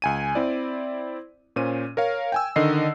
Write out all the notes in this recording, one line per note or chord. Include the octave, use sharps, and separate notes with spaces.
C#2 G#5 D#7
C4 E4 D5
A#2 C#4 C5 D#7
A#4 C#5 F5
G5 G#5 E6
D3 D#3 D#5 C7